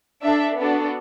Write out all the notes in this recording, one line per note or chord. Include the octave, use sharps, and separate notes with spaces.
D4 A4 E5
B3 D4 F#4 A4